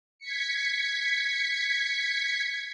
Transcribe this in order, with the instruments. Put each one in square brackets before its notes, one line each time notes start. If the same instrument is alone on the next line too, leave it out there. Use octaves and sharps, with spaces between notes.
[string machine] G#6 B6 C#7